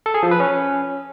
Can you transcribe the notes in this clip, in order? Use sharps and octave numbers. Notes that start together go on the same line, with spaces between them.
A4
G#4
F3
B4
C#4